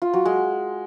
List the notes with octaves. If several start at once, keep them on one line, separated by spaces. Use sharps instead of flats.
F4
F#3
G#3